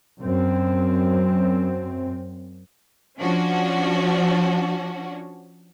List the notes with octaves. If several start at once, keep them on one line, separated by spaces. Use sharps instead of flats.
F#2 C4
F3 C#4 D4 F#4